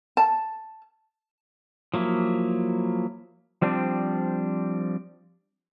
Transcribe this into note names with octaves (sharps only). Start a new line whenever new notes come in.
A5
F3 F#3 A#3 E4
F3 G3 C4 D4